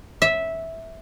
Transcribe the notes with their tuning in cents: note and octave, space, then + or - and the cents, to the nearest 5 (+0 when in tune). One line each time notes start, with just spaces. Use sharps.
E5 -10